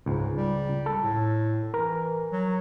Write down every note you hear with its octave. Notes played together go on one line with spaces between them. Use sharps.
C#2 G#2
G3
A4
A2
E3 A#4
F#3